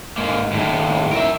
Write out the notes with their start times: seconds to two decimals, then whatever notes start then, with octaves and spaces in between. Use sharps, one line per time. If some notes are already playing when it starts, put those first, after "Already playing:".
0.18 G#2 A#3
0.52 D#2 A2
1.13 A#4 E5